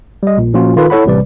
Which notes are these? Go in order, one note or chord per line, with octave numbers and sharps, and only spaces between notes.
G3 D#5
A#1 A#2
A#2 F3 C#4 F4 F#4
D#3 F4 A4 B4
E4 A4 C#5 F#5 B5
A1 C3 G3 B4 D5